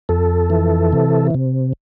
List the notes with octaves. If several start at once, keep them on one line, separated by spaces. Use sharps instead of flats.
F2 A4
E3
C3
C3